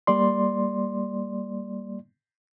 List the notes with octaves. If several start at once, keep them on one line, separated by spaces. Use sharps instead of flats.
G3 A#3 D5 C6